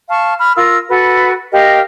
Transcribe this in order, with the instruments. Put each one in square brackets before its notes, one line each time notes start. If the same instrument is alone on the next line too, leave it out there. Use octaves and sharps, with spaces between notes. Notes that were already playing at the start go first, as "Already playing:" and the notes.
[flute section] F5 A5 C#6
B5 F6
F4 A#4 E6
F#4 A4 B4
G4 A#4 D#5 F5